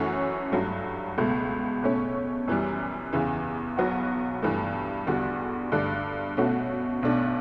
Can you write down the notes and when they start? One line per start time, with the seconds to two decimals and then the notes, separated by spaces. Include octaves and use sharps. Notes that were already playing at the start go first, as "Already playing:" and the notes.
Already playing: F#2 E3 A3 C#4 F#4
0.52 G2 F#3 A3
1.18 C#2 B2 A3
1.82 B2 A3 C#4
2.48 F#2 E3 G3
3.13 E2 C#3 E3
3.77 B1 B2 F#3 B3 F#4
4.42 G2 E3 A3
5.07 E2 D3 G3 D4 F#4
5.72 G2 D3 A3 D4
6.37 B2 A3 C#4 F#4
7.03 B1 B2 A3 D4